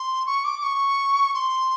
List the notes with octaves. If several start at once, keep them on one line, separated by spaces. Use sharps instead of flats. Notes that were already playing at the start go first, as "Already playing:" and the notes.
Already playing: C6
C#6
D6
C#6
C6